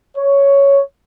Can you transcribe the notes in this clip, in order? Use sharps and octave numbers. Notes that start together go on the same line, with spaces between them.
C#5